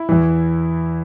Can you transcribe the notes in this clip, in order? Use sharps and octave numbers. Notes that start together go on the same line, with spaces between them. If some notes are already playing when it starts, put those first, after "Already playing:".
Already playing: E4
E2 E3